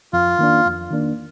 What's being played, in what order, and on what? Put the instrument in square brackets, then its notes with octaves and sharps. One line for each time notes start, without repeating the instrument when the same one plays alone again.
[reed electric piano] F2 [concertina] F4
[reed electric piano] D#3 A#3 D4
F2
D#3 A#3 D4